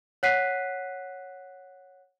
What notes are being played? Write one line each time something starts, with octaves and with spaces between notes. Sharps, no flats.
C#5 F#5 F#6 B6 C7 D#7